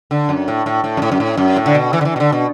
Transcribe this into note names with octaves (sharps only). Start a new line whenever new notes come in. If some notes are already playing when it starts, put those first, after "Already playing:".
D3
F#2
A2
A2
A2
F#2
A2
F#2
A2
F#2
A2
D3
B2
E3
D3
E3
B2
D3
B2